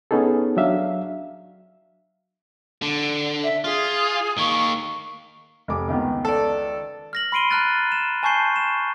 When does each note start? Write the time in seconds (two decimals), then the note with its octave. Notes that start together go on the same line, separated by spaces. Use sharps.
0.11 B3 C#4 D#4 G#4 A4
0.57 F#3 D4 E5 F5
2.82 D3
3.43 E5
3.64 F4 G#4
4.38 D#3 A#3 C#6
5.68 F1 D6
5.88 C#2 D#3 B3
6.25 A4 D5
7.13 F6 A#6 F#7
7.32 B5 C6 C7 D7 D#7 G7
7.51 A#5 B5 F6 F#6 A6
7.92 E7
8.23 G#5 A5 C#6 G6 C7 G7
8.56 E7